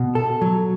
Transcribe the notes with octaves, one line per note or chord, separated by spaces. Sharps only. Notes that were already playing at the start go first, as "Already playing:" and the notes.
Already playing: B2
A4
F#3